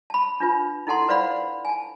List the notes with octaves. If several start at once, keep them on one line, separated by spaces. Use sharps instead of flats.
A5 B5
D4 F4 B4
D#4 E4 A4 F#5 A5 C6
B4 C5 D5 F5 F#5 B5
G#5 A5